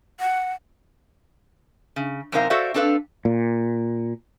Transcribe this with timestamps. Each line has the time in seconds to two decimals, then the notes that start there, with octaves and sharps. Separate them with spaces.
0.20 F#5
1.96 C#3
2.32 F#2 C3 C4 D#4 A#4 F5
2.50 F#4 A4 C5 D5 E5 F5
2.74 C4 D4 A4 B4 F5
3.25 A#2